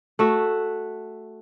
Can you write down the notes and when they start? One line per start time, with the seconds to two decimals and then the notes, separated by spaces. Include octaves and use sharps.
0.19 A3 F#4 E5